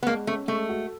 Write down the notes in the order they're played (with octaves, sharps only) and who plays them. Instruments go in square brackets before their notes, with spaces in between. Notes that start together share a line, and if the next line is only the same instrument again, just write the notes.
[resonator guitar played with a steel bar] B3
[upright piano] G#3 [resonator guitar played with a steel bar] A#3
[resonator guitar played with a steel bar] A3 [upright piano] C#4
[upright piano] G#3 [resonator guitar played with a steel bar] A3
[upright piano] F#4